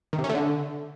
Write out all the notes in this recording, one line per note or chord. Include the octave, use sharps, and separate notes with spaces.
D#3
C3
C#4
A3
D3